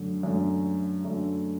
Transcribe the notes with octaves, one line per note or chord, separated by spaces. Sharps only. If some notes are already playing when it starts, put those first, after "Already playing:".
Already playing: F#2 D3 F#3 A3
F#2 D3 F#3 A3
F#2 D3 F#3 A3